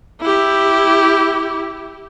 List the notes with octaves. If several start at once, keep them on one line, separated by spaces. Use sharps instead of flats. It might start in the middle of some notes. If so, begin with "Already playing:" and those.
E4 G4